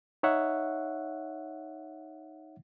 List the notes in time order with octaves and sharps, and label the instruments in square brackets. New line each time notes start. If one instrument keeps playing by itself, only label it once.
[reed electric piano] D#4 C#5 E5 F#5